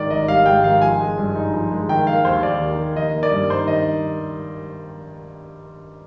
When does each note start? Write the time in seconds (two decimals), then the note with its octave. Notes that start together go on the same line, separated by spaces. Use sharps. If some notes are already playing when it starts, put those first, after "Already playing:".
Already playing: G#2 D#3 D5
0.10 G#1 D#5
0.28 G3 F5
0.46 G#2 G5
0.64 D#3 F5
0.81 F3 G#5
1.00 G#3
1.18 G2
1.35 D#4
1.53 F3
1.71 G#3
1.89 D#3 G5
2.07 A#3 F5
2.25 D#2 C5
2.43 D#2 D5
2.61 D#3
2.79 A#3
2.96 D#3 D#5
3.15 A#3
3.23 D5
3.32 G2
3.50 D#4 C5
3.68 D#3 D#5